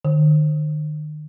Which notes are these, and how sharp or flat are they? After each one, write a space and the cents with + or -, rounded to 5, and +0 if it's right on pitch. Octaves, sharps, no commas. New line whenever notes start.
D#3 -40